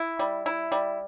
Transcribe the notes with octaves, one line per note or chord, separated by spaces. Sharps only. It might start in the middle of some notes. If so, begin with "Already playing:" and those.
Already playing: E4
G3
E4
G3